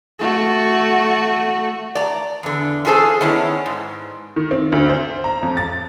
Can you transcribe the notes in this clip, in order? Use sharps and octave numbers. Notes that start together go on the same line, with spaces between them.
A3 F#4
D5 A#5
E2 D3
C#4 F4 G#4 A4 C5
D#3 B3 C#4 D4 E4
G#2
D#3
C4
D2
C5
A#5
F2
A6